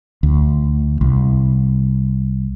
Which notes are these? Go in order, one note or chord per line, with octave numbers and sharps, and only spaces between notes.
D2
C2